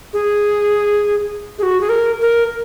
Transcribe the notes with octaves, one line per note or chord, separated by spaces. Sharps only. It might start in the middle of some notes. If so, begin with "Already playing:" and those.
G#4
G#4
F#4
G#4
A#4
A#4